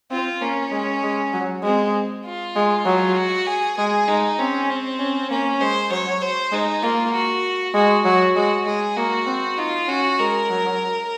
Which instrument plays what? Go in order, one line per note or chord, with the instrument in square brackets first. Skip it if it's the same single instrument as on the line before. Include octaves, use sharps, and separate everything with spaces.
[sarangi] C4 [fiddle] F4
[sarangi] A#3 [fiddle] C#4
[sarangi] G#3
G#3
F#3
[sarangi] G#3 [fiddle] C4
[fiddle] F4
[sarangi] G#3
F#3
[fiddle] F#4
G#4
[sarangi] G#3 [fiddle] G#4
[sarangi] G#3 [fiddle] D#4
[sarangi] C4 [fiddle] C#4
[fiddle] C4
[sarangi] C#4
[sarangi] A#3 [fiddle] C#4
[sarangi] G#3 [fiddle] C5
[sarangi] F#3 [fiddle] C#5
[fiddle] C5
[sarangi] G#3 [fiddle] D#4
[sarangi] A#3 [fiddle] F4
[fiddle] F#4
[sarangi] G#3 [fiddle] F#4
[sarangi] F#3 [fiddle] F#4
[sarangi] G#3 [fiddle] F#4
[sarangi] G#3 [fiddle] G#4
[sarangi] A#3 [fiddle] F#4
[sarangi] C4
[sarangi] D#4 [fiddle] F4
[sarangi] C#4 [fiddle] F#4
[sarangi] G#3 [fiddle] A#4
[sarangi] F#3